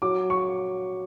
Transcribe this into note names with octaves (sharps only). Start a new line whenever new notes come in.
F#3 D6
C#6